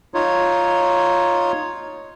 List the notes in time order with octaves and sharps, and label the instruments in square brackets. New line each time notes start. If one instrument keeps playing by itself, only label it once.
[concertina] D#4 F4 C#5